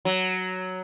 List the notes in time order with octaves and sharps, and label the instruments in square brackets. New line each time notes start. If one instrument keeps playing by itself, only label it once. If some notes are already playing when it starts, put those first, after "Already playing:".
[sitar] F#3